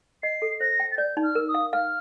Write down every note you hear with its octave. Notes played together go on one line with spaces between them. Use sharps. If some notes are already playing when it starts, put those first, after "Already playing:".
D#5 C7
A4
C5 A#6
G5
A6
D5 G6
D#4
F6
A#4
D#6
F5
F5 F6